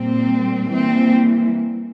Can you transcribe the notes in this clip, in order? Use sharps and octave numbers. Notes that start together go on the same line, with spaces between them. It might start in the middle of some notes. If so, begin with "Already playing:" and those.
Already playing: A#2 G3 A#3 C4
E3 G3 A#3 C4